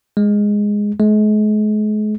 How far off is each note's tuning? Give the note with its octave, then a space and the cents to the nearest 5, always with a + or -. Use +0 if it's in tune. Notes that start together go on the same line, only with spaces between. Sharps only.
G#3 -5
G#3 +40